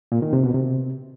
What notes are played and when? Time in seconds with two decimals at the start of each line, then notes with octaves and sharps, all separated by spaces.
0.12 A#2
0.22 D#3
0.33 C3
0.43 B2
0.54 C3